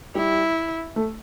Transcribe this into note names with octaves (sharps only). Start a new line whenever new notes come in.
G3 E4
A3